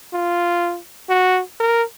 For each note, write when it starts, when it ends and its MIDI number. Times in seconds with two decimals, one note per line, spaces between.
0.13 0.78 65
1.09 1.40 66
1.60 1.83 70